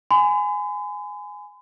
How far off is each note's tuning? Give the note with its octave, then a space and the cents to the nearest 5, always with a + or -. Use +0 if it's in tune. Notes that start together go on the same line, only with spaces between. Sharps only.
G#5 +0 B5 +45